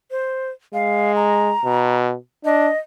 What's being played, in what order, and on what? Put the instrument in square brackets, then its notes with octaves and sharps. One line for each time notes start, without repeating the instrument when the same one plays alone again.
[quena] C5
[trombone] G#3 [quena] F5
[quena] A#5
[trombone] B2
[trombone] D4 [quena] D#5